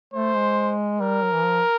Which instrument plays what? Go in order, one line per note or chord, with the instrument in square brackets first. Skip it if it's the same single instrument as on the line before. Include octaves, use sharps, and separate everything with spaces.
[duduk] A3 [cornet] C5
[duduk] G#3
[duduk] G3 [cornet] A#4
[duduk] F#3
E3
F3